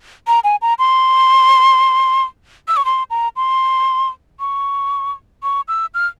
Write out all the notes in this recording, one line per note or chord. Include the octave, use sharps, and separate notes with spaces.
A#5
G#5
A#5
C6
E6
C#6
C6
A#5
C6
C#6
C#6
E6
F6